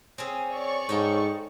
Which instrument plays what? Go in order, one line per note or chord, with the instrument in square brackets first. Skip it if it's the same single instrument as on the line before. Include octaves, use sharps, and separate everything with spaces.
[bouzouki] C4 C#4 G#4
[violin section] C#5 D5 C#6
[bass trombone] G#2 [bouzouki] D#4 A4 G5